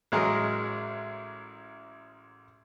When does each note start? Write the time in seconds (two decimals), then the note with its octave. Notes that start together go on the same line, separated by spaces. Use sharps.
0.12 A1 F#3 G#3 G#4 A#4